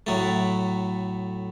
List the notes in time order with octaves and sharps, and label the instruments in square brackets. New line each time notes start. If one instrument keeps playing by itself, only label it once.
[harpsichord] A2 F#3 A3